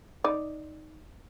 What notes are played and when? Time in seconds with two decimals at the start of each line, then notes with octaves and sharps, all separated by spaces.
0.24 D#4 D5